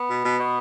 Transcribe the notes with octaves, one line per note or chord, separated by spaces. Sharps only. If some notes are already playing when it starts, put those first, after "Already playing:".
Already playing: B3
B2
B2
B2